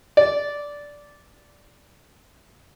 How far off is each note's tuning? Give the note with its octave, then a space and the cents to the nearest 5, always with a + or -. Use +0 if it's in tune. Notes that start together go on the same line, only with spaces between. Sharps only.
D5 -10